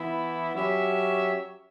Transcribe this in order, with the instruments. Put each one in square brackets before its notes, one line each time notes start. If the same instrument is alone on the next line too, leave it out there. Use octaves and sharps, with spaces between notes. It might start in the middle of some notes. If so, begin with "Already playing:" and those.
Already playing: [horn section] E3 B3 E4
F#3 C#4 G4 C#5 E5